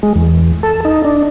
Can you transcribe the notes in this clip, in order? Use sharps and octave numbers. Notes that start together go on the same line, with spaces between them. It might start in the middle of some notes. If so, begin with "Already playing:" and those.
G#3
E2
A4
D#4
D4